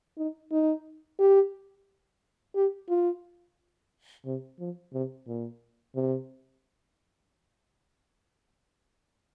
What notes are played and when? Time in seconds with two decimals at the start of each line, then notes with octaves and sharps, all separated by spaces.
0.18 D#4
0.52 D#4
1.20 G4
2.55 G4
2.89 F4
4.25 C3
4.59 F3
4.93 C3
5.27 A#2
5.95 C3